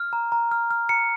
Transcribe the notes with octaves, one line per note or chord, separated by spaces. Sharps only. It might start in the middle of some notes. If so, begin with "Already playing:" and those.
Already playing: F6
A#5
A#5
F6
F6
A#5 C#7